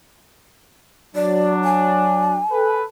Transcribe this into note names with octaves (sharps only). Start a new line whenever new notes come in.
F#3 D4 D5
G#5
A4 B4